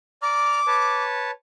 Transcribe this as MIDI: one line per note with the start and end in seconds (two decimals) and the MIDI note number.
0.22 0.59 74
0.22 0.59 82
0.22 1.03 86
0.22 0.59 89
0.67 1.31 71
0.67 1.31 73
0.67 1.31 81